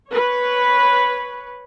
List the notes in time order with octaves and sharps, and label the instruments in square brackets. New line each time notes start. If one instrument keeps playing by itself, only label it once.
[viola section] B4 C#5